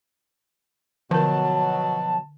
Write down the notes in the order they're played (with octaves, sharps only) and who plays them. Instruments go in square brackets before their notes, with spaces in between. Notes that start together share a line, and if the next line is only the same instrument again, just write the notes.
[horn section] B2 F#3 [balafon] D3 A#4 [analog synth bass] F3 [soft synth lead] A5